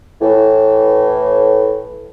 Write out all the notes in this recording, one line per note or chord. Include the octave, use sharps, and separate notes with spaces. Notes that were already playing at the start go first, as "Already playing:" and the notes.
A2 E3